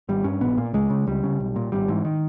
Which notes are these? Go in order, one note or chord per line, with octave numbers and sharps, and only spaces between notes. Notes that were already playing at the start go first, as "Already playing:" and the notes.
G#1 G3
G2 C#4
A#1 B3
A#2 A#3
C#2 G#3
C#3
C#2 G3
C#3
B1
A#2
G#1 G3
G#2 E3
D#3